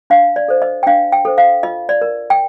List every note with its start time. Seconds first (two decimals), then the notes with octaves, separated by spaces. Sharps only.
0.10 D4 F5
0.36 D5
0.48 A4 C5
0.62 D#5
0.83 G5
0.86 D4 F5
1.12 G5
1.25 A4 C5
1.38 F5
1.63 F4 D#5
1.89 D5
2.02 A#4
2.30 G5